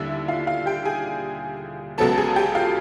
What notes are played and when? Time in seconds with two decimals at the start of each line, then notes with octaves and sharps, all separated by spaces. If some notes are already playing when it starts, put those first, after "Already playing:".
Already playing: D#2 D3 G3 A#3 E4 E5
0.28 F4 F5
0.47 F4 F5
0.66 G4 G5
0.85 G#4 G#5
1.98 C#2 C#3 F#3 B3 A4 A5
2.17 G#4 G#5
2.36 G4 G5
2.55 F4 F5